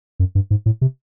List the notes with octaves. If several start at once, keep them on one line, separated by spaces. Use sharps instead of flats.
F#2
G2
G#2
A2
C3